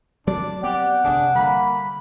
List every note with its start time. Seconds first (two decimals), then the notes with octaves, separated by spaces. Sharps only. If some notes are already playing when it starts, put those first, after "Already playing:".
0.27 F#3 G#3 C4 D4 D5
0.64 B3 C4 G4 D5 F#5
1.04 F1 D3 D4 G#4
1.35 D3 G3 A#3 B5